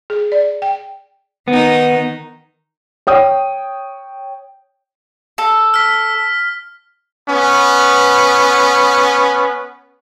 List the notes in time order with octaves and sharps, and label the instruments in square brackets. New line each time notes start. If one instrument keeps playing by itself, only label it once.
[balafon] G#4
D5
G5
[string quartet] D#3 D#4 [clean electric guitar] B3
[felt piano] C#5 G5 D#6
[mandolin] A4
[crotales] F6 B6
[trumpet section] B3 C#4 B4